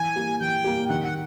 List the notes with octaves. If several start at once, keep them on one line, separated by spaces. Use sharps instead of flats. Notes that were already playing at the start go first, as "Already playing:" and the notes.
Already playing: E3 G#5
G3 A#3
E3 G5
G3 A#3
D#3 F#5
F#5